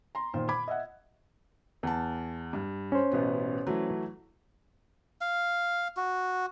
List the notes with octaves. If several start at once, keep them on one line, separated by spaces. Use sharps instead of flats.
A#5 C6
A#2 D#3 F4 C5
B5 D6 G#6
D#5 E5 F#5
E2 A5
G2
C#4 C5
A1 B2 B3
E3 F#3 A3
F5
F#4